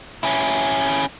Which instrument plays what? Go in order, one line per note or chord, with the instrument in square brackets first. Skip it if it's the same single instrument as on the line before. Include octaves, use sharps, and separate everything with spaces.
[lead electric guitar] C#4 E4